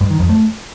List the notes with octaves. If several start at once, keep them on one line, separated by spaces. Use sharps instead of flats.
G2
D#3
F2
A3